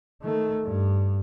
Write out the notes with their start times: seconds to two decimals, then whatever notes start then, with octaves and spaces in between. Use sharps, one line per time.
0.23 D#3 A3
0.65 G2